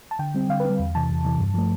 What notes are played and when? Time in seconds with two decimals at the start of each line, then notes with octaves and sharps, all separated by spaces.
0.11 A5
0.19 D3 G5
0.34 G3 C4
0.49 D3 F5
0.60 B4
0.65 G3 C4
0.79 E2
0.95 C3 E3 A5
1.10 E2
1.25 C3 E3
1.39 G2
1.54 F3 A3